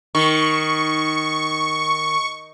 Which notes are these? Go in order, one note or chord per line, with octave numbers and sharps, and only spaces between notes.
D#3 C#6